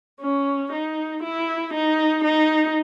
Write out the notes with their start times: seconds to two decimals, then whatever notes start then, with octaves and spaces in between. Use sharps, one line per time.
0.21 C#4
0.72 D#4
1.23 E4
1.73 D#4
2.24 D#4